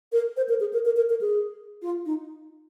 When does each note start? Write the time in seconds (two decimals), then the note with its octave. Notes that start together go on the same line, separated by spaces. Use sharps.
0.12 A#4
0.37 C5
0.49 A#4
0.60 G#4
0.73 A#4
0.85 A#4
0.96 A#4
1.10 A#4
1.21 G#4
1.82 F4
2.06 D#4